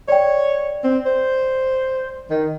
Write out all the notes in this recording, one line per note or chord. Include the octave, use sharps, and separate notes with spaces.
C#5 D5 G5
C4
C5
D#3